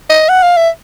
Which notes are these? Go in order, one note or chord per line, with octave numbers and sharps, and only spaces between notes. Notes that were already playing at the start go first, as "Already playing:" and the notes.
D#5
F#5
F5
E5